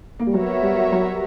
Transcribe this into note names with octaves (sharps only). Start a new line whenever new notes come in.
A#3
G3
F#3 B3 F#4 A#4 C#5 E5
G3
F#3